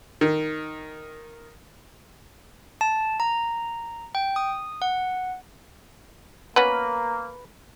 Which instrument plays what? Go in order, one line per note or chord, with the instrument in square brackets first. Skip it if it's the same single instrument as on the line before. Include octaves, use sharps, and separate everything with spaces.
[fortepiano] D#3
[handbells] A5
A#5
G5
D#6
F#5
[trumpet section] A#3 [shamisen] B3 C#4 F#4 [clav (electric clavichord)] B4